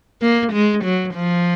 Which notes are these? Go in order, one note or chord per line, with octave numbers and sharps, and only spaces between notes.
A#3
G#3
F#3
F3